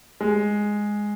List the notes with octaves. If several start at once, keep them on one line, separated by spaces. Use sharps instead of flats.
G#3